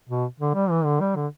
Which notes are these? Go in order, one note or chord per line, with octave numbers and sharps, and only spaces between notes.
B2
D3
G3
E3
D3
G3
D3